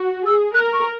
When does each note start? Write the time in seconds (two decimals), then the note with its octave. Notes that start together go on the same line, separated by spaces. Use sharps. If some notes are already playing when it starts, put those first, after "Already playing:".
Already playing: F#4
0.26 G#4 E6
0.54 A#4 F#6
0.73 C#6